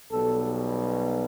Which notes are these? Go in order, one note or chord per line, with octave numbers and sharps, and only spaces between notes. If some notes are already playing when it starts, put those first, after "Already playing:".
B1 B2 G3 B3 A4